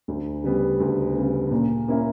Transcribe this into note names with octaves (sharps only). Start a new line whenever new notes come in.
D2
C#3 G3 B3
D2
C#3 G3 B3
A#2
A#3 C#4 E4